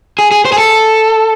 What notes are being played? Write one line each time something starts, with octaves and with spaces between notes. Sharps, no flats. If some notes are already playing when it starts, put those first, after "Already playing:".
G#4
G#4
C5
G#4
A4